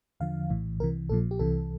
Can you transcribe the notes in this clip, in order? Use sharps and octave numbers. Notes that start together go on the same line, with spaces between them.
E2 D3 F3 F5
A#1 A2 E3
C2 C3 E3 A#4
A#1 A#2 F3 A4
G4
C2 C3 E3 A4